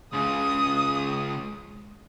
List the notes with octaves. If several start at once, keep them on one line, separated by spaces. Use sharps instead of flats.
C#2 C#3 D#6